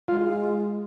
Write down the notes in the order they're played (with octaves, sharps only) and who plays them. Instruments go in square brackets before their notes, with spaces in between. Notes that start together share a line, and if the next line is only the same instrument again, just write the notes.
[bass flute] G#3 [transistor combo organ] F4